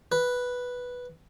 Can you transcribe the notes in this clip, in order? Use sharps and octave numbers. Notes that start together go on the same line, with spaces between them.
B4